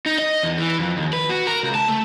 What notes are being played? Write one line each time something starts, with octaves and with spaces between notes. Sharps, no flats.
D#4
D#5
E2
E3
F2
D#2
B4
F#4
A#4
C#2
A5
A3